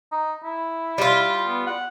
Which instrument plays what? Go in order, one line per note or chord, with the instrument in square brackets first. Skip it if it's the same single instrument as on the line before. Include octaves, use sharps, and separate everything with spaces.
[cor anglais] D#4
E4
[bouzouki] G3 F4
[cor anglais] B3
F#5